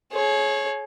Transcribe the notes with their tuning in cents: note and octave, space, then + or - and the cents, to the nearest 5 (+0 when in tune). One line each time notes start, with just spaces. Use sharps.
G#4 +35 C#5 -15